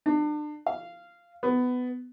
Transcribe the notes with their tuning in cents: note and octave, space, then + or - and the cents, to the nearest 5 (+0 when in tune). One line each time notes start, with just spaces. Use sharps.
D4 +35
F5 -15
B3 +15